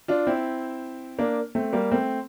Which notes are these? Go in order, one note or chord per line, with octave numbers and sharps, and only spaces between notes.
D4 F4
C4 E4
A#3 D4
A3 C4
G3 A#3
A3 C4